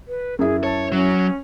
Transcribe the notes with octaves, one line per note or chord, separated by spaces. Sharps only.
B4
F#2 E4 G#4
C#5 A5
F#3 C#4